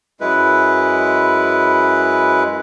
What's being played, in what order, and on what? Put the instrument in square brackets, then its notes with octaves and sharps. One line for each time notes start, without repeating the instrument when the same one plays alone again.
[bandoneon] F#2 G#3 E4 B4